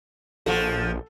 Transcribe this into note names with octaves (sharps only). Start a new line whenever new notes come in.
A#1 F3 F#4 A4